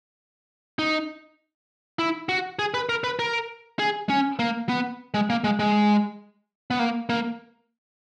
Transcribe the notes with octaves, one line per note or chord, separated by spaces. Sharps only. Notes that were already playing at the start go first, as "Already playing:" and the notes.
D#4
E4
F#4
G#4
B4
A#4
B4
A#4
G#4
C#4
A#3
B3
G#3
A#3
G#3
G#3
B3
A#3
A#3